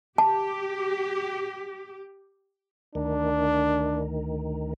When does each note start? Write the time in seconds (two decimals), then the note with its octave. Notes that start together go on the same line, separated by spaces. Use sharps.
0.18 G4 A5
2.95 D2 D#3 D4